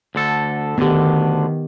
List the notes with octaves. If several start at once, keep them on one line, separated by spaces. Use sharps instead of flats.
D2 D3 A4
D2 D3 D#3 B3 G4